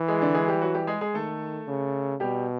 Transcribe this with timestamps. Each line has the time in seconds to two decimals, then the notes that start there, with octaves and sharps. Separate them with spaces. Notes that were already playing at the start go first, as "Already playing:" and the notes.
Already playing: E3
0.08 G#3 G#4
0.22 D3 D4
0.35 G#3 G#4
0.48 G3 G4
0.62 F#3 F#4
0.74 G3 G4
0.87 G#3 G#4
1.01 G#3 G#4
1.14 D#3 A3 A4
1.68 C#3
2.20 B2 G3 G4